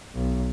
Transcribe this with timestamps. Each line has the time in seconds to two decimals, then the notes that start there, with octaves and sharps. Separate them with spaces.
0.14 B1